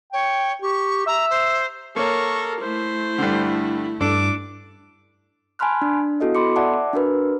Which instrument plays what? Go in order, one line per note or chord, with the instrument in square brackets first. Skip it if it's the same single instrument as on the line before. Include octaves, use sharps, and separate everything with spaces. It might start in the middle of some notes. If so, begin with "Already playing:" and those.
[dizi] C#5 [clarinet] G5
[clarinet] G4 [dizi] C#6
[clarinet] E5 [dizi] A#5
[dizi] C5
[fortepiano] A#3 C#5 [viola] A4 A#4 [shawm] C#6
[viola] A3 E4 [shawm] C5
[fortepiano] G2 D3
[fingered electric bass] G2 [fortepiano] D4 A4 [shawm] D6
[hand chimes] G#5 A5 B5 C6 F6 F#6
D4
B3 E4 F#4 A4 D#5
B3 A4 B5 C6 D6 C#7
D5 E5 F#5 A5 D6
D4 F#4 A#4 B4